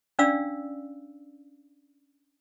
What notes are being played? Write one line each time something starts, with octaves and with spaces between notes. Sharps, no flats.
C#4 D4 D5 F5 E6